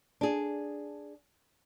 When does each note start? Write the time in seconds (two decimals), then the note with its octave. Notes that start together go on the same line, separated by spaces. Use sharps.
0.21 D4 G#4